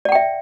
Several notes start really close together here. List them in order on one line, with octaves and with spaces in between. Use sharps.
D5 F#5 G5 E5